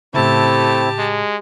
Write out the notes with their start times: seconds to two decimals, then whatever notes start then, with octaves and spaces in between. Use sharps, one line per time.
0.14 A2 C#3 A3 C4 E4 G4 A5
0.98 G#3